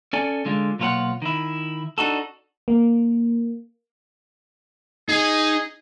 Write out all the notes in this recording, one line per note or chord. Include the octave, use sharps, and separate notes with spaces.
C#4 A4 D5 G#5
D3 G#3 F4
B1 A#2 F4 A4 C#5 F#5
D#3 E4
D4 D#4 F#4 A4
A#3
D#4 G#4